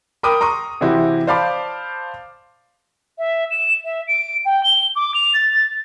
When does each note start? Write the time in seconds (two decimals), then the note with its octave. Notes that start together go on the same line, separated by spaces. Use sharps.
0.23 A#4 G5 B5 D6 D#6
0.41 A#5 C6 C#6 D#6
0.81 C3 E3 C4 E4 F#4 G4
1.27 C5 D5 F5 A5 B5 D6
3.18 E5
3.50 E7
3.84 E5
4.07 D7
4.45 G5
4.63 G7
4.95 D6
5.14 F7
5.34 A6